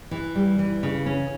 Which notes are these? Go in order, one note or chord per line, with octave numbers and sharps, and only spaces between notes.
E3
G3
E3
C#3
C#4